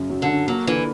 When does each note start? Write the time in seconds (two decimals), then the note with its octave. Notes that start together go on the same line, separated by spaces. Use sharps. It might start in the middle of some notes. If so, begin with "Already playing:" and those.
Already playing: F#2 C#3
0.10 F#3
0.22 D3
0.29 F#2
0.48 F#3 A#3
0.67 D3 E3